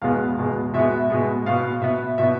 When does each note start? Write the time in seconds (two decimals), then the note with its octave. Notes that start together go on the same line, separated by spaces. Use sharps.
0.01 E2 B2 G#3 B3 F5
0.38 E2 B2 G#3 B3
0.74 B2 G#3 B3 E5
1.10 B2 G#3 B3
1.46 B2 B3 F5
1.82 B2 B3 E5
2.18 B2 B3 E5